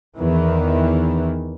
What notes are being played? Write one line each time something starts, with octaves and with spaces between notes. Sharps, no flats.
E2 D#3 E3